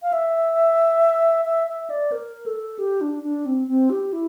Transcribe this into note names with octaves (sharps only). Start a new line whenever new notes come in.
F5
E5
E5
E5
D5
A#4
A4
G4
D4
D4
C4
C4
G4
E4